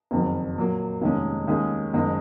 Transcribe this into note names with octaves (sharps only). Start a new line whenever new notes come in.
F#1 F2 D#3 F#3
A#2 F#3 A#3
F1 D#2 D#3 G#3 C#4
D#2 D#3 G#3 C#4 G#4
F#1 F#2 D#3 G#3